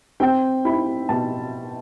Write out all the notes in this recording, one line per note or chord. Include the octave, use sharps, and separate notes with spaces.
C4 G5
E4 B5
B2 A5